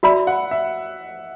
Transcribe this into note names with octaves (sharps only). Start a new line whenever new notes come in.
F#4 D5 E5 B5
F#5
E5